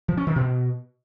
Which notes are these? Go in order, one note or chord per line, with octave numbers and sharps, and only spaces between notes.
F3
C#4
D#3
B2